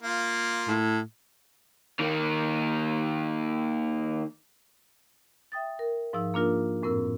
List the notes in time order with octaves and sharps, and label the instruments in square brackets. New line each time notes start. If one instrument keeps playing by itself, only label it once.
[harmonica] A#3 F4
[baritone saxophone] A2
[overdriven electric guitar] D#3 A#3
[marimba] E5 G5 D#6 A6
A#4
G#2 F3 D#4 E6
A#3 D4 F4 A#4
F#2 A2 C4 A#4 E6